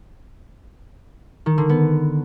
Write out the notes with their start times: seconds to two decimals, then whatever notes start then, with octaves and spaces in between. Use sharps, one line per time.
1.46 D#3
1.58 D3
1.69 B3